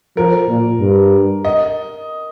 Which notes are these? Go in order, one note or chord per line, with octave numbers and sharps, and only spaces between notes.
F3 A#4
A#2
G2
D#5